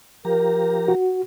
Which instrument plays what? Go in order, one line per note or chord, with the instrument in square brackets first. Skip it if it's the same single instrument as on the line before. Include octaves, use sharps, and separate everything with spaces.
[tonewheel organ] F3 G4 A#5 [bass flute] A#4
[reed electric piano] F#4